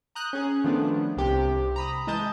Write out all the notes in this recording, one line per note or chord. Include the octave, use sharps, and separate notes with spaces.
A#5 D#6 F#6 G6
C#4 G#4
D#3 F3 A3 B3 D4
C2 C3 G4
A#5 B5 D#6
E3 G#3 D#5 A5 G6